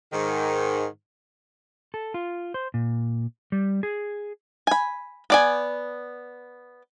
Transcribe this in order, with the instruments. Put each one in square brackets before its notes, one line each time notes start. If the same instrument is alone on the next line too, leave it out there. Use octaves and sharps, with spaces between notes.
[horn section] G#2 D#3
[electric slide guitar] A4
F4
C5
A#2
G3
G#4
[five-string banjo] G#5 B5
B3 D5 G#5